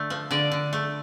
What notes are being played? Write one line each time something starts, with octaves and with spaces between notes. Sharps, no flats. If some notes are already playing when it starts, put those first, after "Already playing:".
Already playing: D3 A3
F3
D3 D5
D3
A3